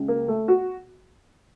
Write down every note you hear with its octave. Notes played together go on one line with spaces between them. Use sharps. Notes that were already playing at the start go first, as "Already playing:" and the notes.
Already playing: C#2 C#3
A#3
A3
F#4